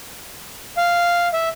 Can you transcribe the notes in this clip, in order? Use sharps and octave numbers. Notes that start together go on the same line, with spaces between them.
F5
E5